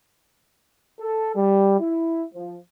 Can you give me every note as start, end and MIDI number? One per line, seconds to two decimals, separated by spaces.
0.99 1.33 69
1.36 1.80 55
1.80 2.24 64
2.34 2.57 53